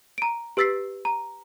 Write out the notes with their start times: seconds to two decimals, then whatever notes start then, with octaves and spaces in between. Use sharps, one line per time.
0.18 A#5 D7
0.57 G4 B4 E6 A6 B6 C7
1.05 A#5